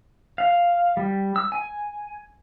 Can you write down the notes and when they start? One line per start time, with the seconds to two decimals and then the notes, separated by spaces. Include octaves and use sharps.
0.38 F5
0.97 G3
1.36 E6
1.52 G#5